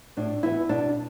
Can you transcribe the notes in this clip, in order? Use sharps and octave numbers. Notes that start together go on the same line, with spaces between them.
A2 D4
E3 B3 E4
B2 D4